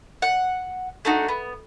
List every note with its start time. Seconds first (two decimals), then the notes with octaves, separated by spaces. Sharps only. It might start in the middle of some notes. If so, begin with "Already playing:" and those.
0.22 F#5
1.05 A3 D4 D#4 F#4
1.29 B3